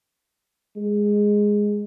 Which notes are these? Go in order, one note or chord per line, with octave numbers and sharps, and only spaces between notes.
G#3